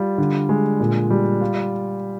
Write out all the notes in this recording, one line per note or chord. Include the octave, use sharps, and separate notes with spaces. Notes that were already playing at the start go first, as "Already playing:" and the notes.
Already playing: G3 F4
D3
G#3
A#2
G3
F4